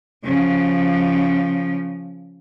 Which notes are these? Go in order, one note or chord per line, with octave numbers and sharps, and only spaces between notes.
C#3 F3